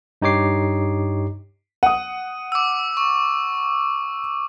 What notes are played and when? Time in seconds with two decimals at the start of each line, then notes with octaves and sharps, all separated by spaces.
0.22 G2 D#4 G4 C#5 D6 C7
1.83 F#5 D#6 D#7
2.52 D6 E6
2.97 C#6